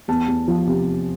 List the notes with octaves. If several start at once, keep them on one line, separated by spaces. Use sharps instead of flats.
E2 A5
E2
F3
C3